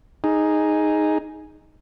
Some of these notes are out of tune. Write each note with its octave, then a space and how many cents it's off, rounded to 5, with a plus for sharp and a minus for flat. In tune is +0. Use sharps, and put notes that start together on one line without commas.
D#4 +0 G#4 +0